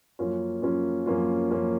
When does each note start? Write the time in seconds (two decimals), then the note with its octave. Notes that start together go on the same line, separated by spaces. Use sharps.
0.19 F#2 F3 A#3 C#4 F4
0.62 F#2 F3 A#3 C#4 F4
1.06 F#2 F3 A#3 C#4 F4
1.50 F#2 F3 A#3 C#4 F4